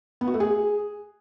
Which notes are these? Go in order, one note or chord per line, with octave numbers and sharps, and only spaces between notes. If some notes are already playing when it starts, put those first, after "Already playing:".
B3
F#4
A3
G#4